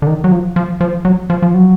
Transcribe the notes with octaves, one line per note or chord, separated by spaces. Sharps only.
D3
D#3
F#3
F3
F3
F3
F#3
F3
F3
F#3